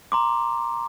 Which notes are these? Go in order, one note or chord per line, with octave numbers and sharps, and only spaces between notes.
A#5 C6 D6